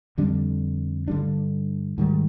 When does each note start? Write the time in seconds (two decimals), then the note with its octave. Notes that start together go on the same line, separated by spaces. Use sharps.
0.18 F2 D3 G3 D4
1.08 G2 D3 G3 D4
1.98 G#2 D#3 G3